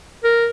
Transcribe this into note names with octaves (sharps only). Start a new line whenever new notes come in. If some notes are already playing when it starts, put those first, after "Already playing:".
A#4